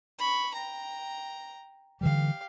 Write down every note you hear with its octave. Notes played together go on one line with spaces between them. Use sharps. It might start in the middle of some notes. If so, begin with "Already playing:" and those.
B5 C#6
G5 A#5
D3 E3 G3 G4 F5